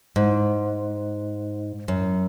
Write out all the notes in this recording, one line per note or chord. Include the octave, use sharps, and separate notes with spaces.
G#2
F#2